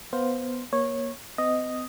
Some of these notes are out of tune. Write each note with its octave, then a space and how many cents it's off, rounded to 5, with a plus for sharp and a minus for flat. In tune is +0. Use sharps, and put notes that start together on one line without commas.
B3 +0 C5 +0 F5 +10
A#3 +25 C#5 -15
C4 -45 D#5 +0